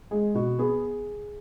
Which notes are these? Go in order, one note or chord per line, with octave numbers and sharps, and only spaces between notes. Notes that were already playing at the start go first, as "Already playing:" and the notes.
G#3 G#4
B2 F#4
B3 G#4